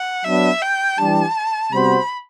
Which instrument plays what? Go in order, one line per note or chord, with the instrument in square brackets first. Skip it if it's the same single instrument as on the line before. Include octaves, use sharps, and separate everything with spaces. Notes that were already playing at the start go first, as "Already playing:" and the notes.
Already playing: [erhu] F#5
[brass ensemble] F#3 B3 D4 [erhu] E5
[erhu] G5
[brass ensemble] E3 G3 D4 G4 [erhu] A5
[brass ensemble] C3 G3 B3 F#4 C5 [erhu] B5